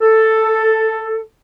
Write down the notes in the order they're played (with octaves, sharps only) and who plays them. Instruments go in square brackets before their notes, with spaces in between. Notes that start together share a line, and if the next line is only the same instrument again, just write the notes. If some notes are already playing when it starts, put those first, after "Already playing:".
[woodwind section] A4